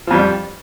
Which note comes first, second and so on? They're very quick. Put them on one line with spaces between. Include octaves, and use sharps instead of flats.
F3 F2 G3